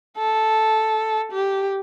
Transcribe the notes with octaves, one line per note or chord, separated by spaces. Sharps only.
A4
G4